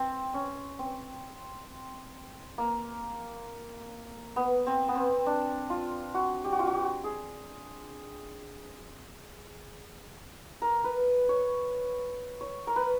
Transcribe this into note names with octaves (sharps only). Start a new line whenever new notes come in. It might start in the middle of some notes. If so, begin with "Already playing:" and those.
Already playing: C4
C#4
C4
A#3
B3
C4
B3
C4
D4
F4
F#4
G4
F#4
F4
F#4
G4
G#4
A#4
B4
C#5
C#5
A#4
B4